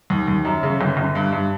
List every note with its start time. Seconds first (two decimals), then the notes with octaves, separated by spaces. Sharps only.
0.10 D#2
0.28 D#2
0.45 F#2
0.63 C#3
0.81 G1
0.97 G1
1.15 G2
1.32 G2